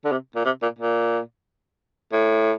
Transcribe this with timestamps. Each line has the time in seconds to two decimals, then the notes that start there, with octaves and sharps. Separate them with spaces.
0.05 D3
0.12 C3
0.36 A#2
0.45 C3
0.62 A#2
0.79 A#2
2.12 A2